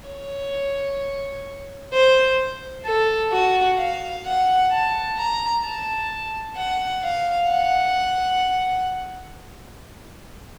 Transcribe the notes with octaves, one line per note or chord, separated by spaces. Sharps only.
C#5
C5
A4
F#4
F5
F#5
A5
A#5
A5
F#5
F5
F#5